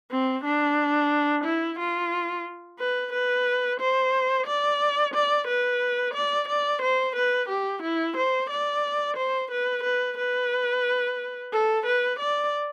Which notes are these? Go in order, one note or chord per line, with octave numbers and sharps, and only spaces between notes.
C4
D4
E4
F4
B4
B4
C5
D5
D5
B4
D5
D5
C5
B4
G4
E4
C5
D5
C5
B4
B4
B4
A4
B4
D5